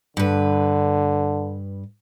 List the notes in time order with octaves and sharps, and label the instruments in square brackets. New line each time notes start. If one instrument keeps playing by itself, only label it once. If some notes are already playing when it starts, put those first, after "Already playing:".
[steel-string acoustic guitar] G2 B4 [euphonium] D3